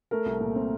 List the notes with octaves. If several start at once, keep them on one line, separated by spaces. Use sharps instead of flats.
A3 A#4
C2
A#2
C4